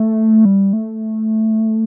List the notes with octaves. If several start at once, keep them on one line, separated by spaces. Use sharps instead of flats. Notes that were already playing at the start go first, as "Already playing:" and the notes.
Already playing: A3
G3
A3